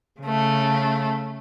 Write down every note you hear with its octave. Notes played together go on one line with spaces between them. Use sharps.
C#3 A3